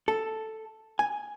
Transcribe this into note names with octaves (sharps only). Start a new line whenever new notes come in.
A4
G#5